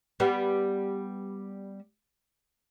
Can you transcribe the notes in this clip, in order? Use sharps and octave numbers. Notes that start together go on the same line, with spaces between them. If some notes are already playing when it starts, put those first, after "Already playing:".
G3 B3